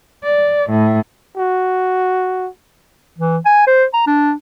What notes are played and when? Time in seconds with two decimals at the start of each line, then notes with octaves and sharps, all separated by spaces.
0.23 D5
0.70 A2
1.37 F#4
3.18 E3
3.45 G#5
3.67 C5
3.93 A#5
4.07 D4